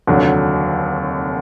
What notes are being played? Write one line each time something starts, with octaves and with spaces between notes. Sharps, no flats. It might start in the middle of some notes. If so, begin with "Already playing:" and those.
F1 D#2 D3 F#3